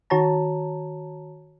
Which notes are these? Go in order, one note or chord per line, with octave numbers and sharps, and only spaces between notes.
D#3 F#4 C#5 A5 A#5